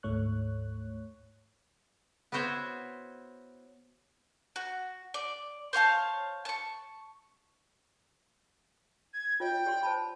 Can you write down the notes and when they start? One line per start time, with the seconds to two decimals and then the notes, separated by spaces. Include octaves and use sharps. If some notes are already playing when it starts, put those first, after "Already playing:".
0.03 D2 G#2 A3 C#5 C#6 F#6
2.32 B3 E4 F#4 C5 C#5
4.56 F#4
5.14 D5
5.73 C5 C#5 F5 A5
6.45 A5 C#6
9.14 G#6
9.40 F4 C#5 D#5 G5
9.66 G4 D5 C6
9.83 C5 A5 B5